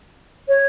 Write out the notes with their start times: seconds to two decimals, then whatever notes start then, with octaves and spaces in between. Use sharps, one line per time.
0.48 C#5